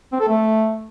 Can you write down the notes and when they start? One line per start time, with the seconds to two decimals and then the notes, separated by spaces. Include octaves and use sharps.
0.12 C4
0.20 A4
0.28 A3